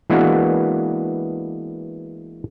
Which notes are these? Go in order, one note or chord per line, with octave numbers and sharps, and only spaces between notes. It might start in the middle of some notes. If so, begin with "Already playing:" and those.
E3 G#3 A#3 B3 D4 F#4